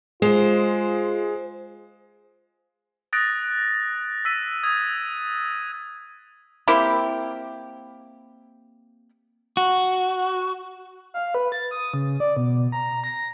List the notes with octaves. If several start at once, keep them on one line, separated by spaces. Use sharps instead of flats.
G#3 F4 C5
D#6 F#6 A6 A#6 D7
E6 B6 D#7
D#6 G#6
A#3 C4 E4 G4
F#4
F5
B4
A6
D#6
C#3
D5
B2
A#5
A#6